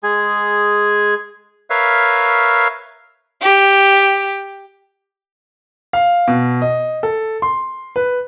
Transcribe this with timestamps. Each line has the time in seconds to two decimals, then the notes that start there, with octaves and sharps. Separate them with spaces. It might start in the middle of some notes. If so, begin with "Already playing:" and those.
0.03 G#3 G#4 G#5
1.70 A#4 B4 C#5 E5 F5
3.40 G4
5.93 F5
6.28 B2
6.62 D#5
7.03 A4
7.42 C6
7.96 B4